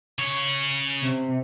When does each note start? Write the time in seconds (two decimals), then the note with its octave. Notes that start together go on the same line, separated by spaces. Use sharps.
0.19 C#3 C#5
1.02 C3